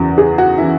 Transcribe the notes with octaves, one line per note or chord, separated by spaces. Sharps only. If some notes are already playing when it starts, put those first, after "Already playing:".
Already playing: F#1 E2 C#3 E3 F#4
G#4
F#4
C#3 E3 E4